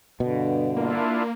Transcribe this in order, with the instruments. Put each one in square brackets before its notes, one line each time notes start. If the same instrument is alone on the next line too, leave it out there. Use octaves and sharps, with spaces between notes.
[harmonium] G2 D3 [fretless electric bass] B2
[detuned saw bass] A#3 [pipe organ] D4 E4 F4